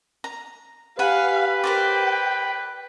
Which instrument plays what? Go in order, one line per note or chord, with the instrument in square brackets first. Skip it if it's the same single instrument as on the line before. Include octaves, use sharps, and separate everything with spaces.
[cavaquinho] A#5
[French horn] G4 [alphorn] B4 [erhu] F5 [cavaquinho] F#5 G#5 B5
[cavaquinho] A#4 C5 D5 [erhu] G5